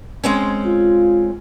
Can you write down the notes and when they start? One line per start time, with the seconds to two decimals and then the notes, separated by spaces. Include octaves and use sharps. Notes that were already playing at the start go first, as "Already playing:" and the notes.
0.24 G#3 C4 C#4
0.66 F4